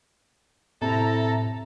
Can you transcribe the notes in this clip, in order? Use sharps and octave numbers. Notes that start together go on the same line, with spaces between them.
A2 C3 E4 A4 A#5